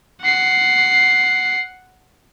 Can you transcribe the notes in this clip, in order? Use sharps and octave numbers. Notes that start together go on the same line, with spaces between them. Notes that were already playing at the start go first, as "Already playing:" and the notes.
F#5 C7